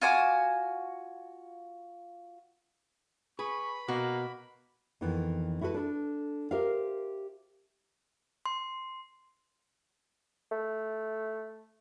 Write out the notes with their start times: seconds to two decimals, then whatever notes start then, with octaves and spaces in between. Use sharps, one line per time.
0.01 F4 F#4 G#5 D6
3.39 G#4 B4 B5 C#6
3.88 B2 A#3 F#4
5.01 F2 D#3 E3 B3
5.61 E4 F#4 A4 B4
5.74 D4 A4
6.51 G4 A#4 C5 E5 F5
8.46 C6
10.52 A3